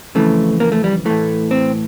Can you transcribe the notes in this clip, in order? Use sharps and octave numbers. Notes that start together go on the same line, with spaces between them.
F2 C#3 E3 A3
A#3
A3
G3
A2 E3 A3
C4